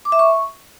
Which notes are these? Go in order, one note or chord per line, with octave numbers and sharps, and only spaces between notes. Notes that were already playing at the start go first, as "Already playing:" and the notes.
D6
E5
C#6